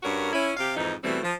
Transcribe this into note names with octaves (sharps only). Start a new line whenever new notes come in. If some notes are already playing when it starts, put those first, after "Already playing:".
G2 C#4 F#4 A#4
C#4 E4
C3 G4 F5
F2 G#2 E3 D#4
B2 E3 G3 A3 C4
F3